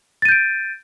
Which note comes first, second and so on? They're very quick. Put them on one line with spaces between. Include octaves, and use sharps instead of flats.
A6 D#7 G6 D7